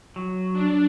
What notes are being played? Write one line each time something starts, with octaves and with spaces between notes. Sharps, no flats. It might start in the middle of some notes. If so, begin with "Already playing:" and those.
F#3
D4